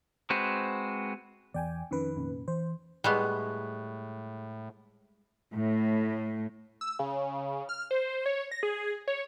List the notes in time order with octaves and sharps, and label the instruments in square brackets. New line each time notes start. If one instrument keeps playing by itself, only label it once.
[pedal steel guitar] G#3 C4 F#4 B4 C5
[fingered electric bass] E2 E3 [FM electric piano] D5 G5 G#5
[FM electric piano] F2 D#3 B4 [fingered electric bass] C#4
[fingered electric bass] F1 A#2 C#4
[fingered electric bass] E3 [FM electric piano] C5
[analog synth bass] A2 [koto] G3 G#3 B3 [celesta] G#4 C#6 F#6
[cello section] A2
[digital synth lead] E6
C#3
F6
C5
C#5
A#6
G#4
C#5